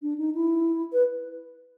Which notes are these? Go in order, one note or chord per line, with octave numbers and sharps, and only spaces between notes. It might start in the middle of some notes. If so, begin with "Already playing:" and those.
D4
D#4
E4
B4